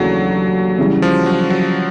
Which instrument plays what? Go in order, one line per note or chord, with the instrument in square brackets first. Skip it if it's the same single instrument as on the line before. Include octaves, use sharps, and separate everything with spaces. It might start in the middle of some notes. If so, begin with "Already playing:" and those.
Already playing: [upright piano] D#2 C#3 E3 A3 D4 [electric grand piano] F#3
[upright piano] C#3 E3 G3
[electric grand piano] F3
F#3
F#3